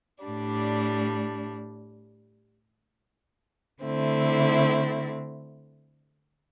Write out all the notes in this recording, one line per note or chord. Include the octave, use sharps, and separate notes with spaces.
A2 G3 D4
D3 A3 C4 E4